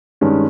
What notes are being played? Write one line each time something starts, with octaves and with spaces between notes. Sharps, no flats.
G2 D#3 G#3 C#4